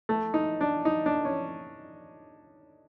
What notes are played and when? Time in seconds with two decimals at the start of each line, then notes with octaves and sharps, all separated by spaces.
0.09 A3
0.34 D#4
0.61 D4
0.85 D#4
1.06 D4
1.25 C#4